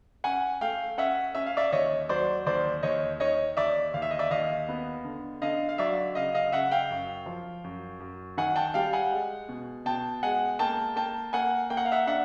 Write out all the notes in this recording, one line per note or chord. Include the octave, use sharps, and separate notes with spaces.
C#4 F#5 G#5
A3 F5 G5
C#4 E5 F#5
C#4 E5
F5
D5 E5
D#2 C#5 D#5
F#3 C5 D5
D#2 C5 D5
D#2 C#5 D#5
D#3 C#5 D#5
D#2 D5 E5
D#2 F5
E5
D#5
D5 E5
D#2 D#5 F5
B3
D3
D3 D#5 F5
F5
F#3 D5 E5
C#3 D#5 F5
D#5 F5
C#3 E5 F#5
F5 G5
F#2
F3
F#2
F#2
D#3 F#5 G#5
G5 A5
G3 F5 G5
F#5 G#5
G#3
B2
B2 G5 A5
G#3 F#5 G#5
A#3 G5 A5
A#3 G5 A5
A#3 F#5 G#5
A#3 G5
F#5
F5
E5 F#5
D4 E5 F#5